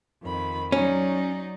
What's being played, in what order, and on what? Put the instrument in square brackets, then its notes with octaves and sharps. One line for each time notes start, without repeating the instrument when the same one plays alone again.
[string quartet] F2 D#3 B5
[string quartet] F#3 D#4 D5 [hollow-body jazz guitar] C#4